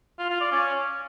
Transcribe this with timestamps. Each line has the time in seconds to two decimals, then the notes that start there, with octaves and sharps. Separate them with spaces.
0.19 F4
0.30 F4
0.41 D5
0.52 C#4